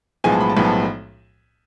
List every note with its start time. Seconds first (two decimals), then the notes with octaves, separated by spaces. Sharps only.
0.24 B1 A2 F3 G#3 B3 G#5
0.32 A5
0.40 B5
0.50 A5
0.57 B1 A2 F3 G#3 B3 B5
0.65 A5